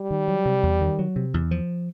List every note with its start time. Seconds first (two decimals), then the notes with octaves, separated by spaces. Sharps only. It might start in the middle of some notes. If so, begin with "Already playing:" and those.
Already playing: G3
0.11 D#3
0.28 F#3
0.46 C3
0.63 E2
0.81 D#3
0.99 F#3
1.16 C3
1.34 E2
1.51 F3